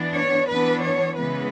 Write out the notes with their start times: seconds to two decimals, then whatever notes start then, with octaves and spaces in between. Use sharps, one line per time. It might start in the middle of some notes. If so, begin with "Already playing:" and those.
Already playing: E3 B3 D4
0.15 C#5
0.48 E3 B3 D4 B4
0.82 C#5
1.15 C#3 E3 G#3 B3 B4